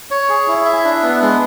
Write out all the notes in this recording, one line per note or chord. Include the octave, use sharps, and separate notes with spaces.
C#5
G#4
E4
E5
D4
B3
G#3